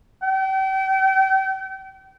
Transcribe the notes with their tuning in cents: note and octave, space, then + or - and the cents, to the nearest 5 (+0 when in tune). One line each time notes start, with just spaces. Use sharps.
G5 -35